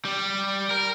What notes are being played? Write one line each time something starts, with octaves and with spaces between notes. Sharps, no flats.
G3
A#4